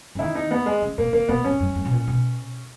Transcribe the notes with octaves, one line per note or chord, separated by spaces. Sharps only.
C#3
D#3 E4
D#4
B3
G#3
C#3
B2 A#3
D#3 A#3
B2 B3
G#2 C#4
F#2
F#2
B2
A#2
B2